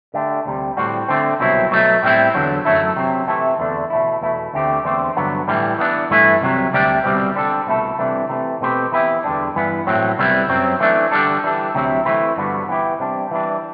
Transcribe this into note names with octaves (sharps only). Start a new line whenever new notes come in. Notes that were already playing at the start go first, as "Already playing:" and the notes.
D3 A3 D4 G4
D2 C3 G3
A2 G3 C4 F#4
D3 A3 C4
C2 B2 F#3 C4 E4
B2 F#3 A3
A2 G3 C4 E4
E2 D3 F#3
F#2 F#3 A3 E4 A4
C3 F#3 C4
C3 E3 A3 E4 A4
E2 D3 A3 D4
B2 A3 E4
E2 B2 A3 E4
D2 D3 A3 C4 G4
E2 D3 A3 C4
G2 D3 F#3 B3
A2 E3 G3
E3 B3 D4
G2 E3 A3 E4 B4
C2 C3 F#3
D2 C3 G3 D4 G4
C2 B2 G3 C4
D3 G3 D4 A4
C2 B2 A3 E4 A4
C2 C3 E3 A3 D4
C3 E3 A3
B2 A3 C4 G4 B4
E3 B3 E4 G4 B4
E2 D3 G3 D4
G2 E3 B3
A2 F#3 C4
C2 C3 G3 B3 E4
F#2 F#3 C4
E3 A3 D4
D3 G3 D4 A4
E3 G3 D4 A4
D2 C3 F#3 C4 E4
E3 A3 C4 E4 B4
G2 D3 G3 B3 F#4
E3 B3 E4 G4
C3 G3 D4
E3 G3 D4